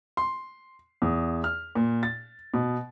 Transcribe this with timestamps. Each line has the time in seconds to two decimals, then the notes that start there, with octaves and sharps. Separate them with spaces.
0.17 C6
1.02 E2
1.44 F6
1.75 A#2
2.03 A6
2.54 B2